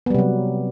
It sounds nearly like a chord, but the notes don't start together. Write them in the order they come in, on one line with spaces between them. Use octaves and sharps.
B3 G3 C3 F#3